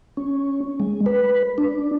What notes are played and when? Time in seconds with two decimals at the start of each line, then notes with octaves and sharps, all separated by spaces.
0.17 C#4
0.80 G#3
1.06 B4
1.58 D4